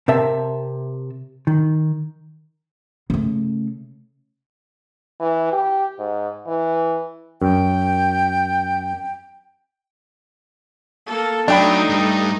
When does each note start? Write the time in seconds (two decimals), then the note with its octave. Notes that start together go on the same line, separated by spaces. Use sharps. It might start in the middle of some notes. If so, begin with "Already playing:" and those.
0.08 C3 A#4 E5 A5
1.47 D#3
3.10 C#3 A3
5.20 E3
5.52 G4
5.99 G#2
6.47 E3
7.42 F#2 G5
11.06 A#3 A4
11.48 F#3 A3 D4 D#4 G5 B5
11.90 G2 G3